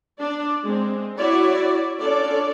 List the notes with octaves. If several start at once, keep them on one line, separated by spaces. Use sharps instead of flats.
D4 D5
G#3 C4
E4 F#4 C#5 D5
C#4 D4 F4 A4 C#5 D5